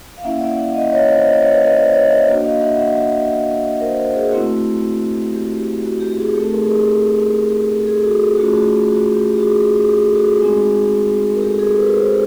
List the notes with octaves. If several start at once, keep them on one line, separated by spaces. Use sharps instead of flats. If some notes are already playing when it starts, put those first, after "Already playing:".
F5
A#3 C#4 E4 E5 F#5
D5 E5
E5 F#5
D#5 F5
C#5 D#5
C5 D5
D#5
D5
C#5 D#5
B4 C#5
D#5
C5 D5
C#5 D#5
D5 E5
A#3 D4 F#4
D#5 F5
E5 F#5
E5 F#5
A#4 C5
A#4 C5
G#4 A#4
A3 C4 E4 F#4
G4
G4
F#4
G4
G4
F#4 G#4
A3 C4 D#4 G4 A4
G#4 A#4
G#4 A#4
G#4
A4
F#4 G#4
G4 A4
A3 C#4 F4 F#4 G#4
F#4 G#4
F#4
G4
G4
F#4 G#4
G#4
G4
A4
F#4 G#4
G#3 C4 D#4
A#4
G4 A4
G#4 A#4
A4 B4
A#4 C5